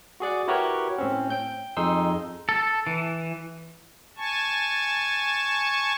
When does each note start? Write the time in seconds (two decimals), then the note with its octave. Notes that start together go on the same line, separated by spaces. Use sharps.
0.20 F#4 G#4 D5 F#5
0.48 E4 F#4 G4 A#4 B4 C#5
0.98 A2 C4 C#4
1.30 G5 G6
1.77 F2 D#4 G#4 C6 E6
2.49 A4
2.87 E3
4.17 G#5 A5 C#6